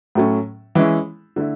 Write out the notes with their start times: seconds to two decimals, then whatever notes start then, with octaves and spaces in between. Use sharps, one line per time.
0.15 A2 F#3 A3 C#4
0.75 E3 G#3 C#4 E4
1.36 D3 A3 E4